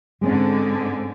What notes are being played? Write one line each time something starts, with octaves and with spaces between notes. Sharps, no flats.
G#2 D3 G#3 C4 C#4